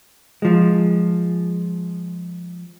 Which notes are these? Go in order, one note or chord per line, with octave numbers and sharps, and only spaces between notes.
F3 G#3